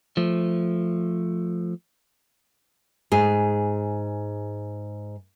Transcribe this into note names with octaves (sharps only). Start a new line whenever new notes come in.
F3 A3
G#2 G#4